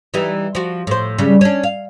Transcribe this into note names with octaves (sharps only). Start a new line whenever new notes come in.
E3 G3 D#4
F3 F#4
A2 C5
C#3 G3
C#4 D4
F5